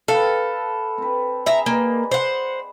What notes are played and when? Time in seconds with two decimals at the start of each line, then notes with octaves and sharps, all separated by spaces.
0.08 A4 B4 F5 G5
0.98 C4 B4
1.46 G#4 E5 A#5
1.66 A#3 B4 D5 D#5
2.11 C5 F#5